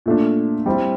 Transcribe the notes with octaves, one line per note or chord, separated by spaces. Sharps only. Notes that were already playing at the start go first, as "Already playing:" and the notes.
A#2 A3 D4
G3 C4 E4